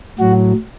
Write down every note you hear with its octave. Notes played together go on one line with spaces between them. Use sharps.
A2 F#3 F#4